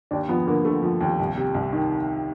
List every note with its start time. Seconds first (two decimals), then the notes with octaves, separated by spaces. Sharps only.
0.11 D#2 D4
0.29 F3 B3
0.47 D3 A#3
0.65 D3 A3
0.82 F3
1.01 D#2
1.19 C2
1.37 C3
1.54 C2
1.73 D#3